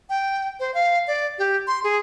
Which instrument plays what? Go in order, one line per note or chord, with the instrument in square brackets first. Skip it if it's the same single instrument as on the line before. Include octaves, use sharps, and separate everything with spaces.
[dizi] G5
C5
F5
D5
G4
C6
G#4